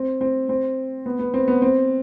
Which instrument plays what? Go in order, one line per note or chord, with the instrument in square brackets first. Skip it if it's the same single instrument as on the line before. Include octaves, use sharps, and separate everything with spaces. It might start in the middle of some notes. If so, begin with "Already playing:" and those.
Already playing: [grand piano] C4
C4
C4
B3
B3
C4
B3
C4